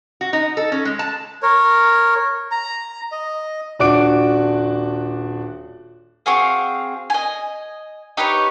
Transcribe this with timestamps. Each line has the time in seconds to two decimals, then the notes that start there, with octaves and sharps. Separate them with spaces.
0.21 F#4
0.33 D#4
0.57 A4
0.72 C#4
0.85 G#3
0.99 A5
1.42 A#4 C#5
2.51 A#5
3.12 D#5
3.79 D#1 D4 F#4 D6 D7
6.26 C4 F#4 G#4 F5
7.10 D#5 G#5
8.17 D#4 G4 B4 C#5